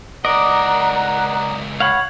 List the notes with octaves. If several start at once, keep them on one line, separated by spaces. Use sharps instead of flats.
C#2 A#4 D5 D#5 F#5 A#5
C#5 F5 F#5 B5